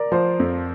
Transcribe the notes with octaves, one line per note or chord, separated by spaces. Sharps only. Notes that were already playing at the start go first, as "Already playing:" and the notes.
Already playing: A#4 D5
F3 C5
F2